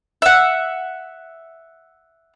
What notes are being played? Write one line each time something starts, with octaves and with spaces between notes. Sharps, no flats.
E5 F#5